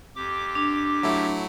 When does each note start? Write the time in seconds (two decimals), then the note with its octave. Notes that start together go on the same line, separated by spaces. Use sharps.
0.16 F2 G4 D6
0.55 D4
1.03 F#3 A3 E4